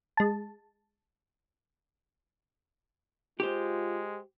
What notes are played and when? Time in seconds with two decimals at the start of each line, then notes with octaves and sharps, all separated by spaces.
0.17 G#3 A5
3.40 G#3 F4 G4 C5